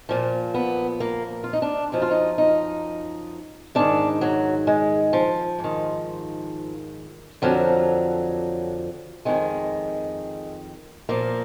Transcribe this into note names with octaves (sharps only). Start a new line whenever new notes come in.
A#2 F3
B3
A#3
F4
D#4
D4
F#2 F3 D#4
F4
D#4
D#4
G#2 D#3 D4
F#3
G#3
F3
G#2
D#3
F2 D3 F3 F#3
F2 D#3 G#3
A#2 F3 A#3